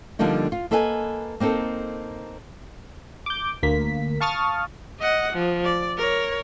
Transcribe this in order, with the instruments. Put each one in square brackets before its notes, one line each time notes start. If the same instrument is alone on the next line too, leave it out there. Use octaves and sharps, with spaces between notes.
[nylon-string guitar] D3 F3 G3 A#3 D4 D#4
F4
A#3 A4 B4 D#5 F5 G#5
A#3 C4 D#4 A4
[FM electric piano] D6 G6
D2 A#3 B6
F5 A5 C#6 D#6 F6 A6
[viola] D#5 F#5
F3
D5
A#4 C#5